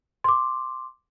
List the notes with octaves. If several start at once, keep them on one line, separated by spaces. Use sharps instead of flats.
C6 D6